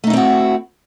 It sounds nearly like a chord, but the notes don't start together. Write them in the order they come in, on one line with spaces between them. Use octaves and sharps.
A3 D#4 E4 C4 F#4